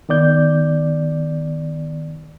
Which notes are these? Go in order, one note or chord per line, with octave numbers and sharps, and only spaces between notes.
D#3 B3 D5 G6